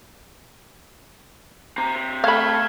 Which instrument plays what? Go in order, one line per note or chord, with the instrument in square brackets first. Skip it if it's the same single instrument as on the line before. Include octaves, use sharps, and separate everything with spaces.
[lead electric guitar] C4 A#5
[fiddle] A3 [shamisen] F5 B5 [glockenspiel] F6 G#6